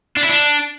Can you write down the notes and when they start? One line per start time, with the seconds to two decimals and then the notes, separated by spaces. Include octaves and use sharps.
0.17 D4
0.23 E4
0.29 D4